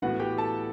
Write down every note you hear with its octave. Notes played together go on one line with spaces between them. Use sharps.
A2 E3 B3 F#4 F#5
G4 G5
A4 A5